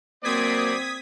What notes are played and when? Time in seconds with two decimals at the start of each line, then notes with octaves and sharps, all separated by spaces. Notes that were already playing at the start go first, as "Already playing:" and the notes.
0.24 F#3 A#3 C4 C5 D5 D#6 G#6 B6